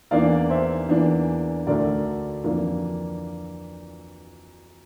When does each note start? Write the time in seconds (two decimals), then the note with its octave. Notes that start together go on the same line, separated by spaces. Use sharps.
0.11 E2 E3 A#3 D4 D5 F5
0.50 C5 E5
0.89 E2 E3 A#3 D4
1.67 D2 D3 A3 A#4 D5
2.44 F2 E3 A#3 D4